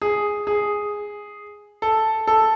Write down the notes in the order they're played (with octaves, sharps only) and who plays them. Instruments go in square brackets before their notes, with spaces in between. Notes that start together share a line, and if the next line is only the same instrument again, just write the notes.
[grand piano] G#4
G#4
A4
A4